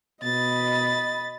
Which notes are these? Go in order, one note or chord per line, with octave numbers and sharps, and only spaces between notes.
B2 D#5 B5 A6